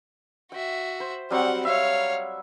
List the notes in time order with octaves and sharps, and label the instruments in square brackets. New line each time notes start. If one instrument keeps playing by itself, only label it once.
[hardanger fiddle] F#4 E5 [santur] G5
[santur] C5
[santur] F#3 G3 [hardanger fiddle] C4 F#5
[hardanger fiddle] C#5 F5 [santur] E5